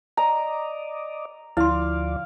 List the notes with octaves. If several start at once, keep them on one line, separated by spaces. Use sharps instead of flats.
D5 D#5 A#5
D2 F3 E4 D5 F5 C6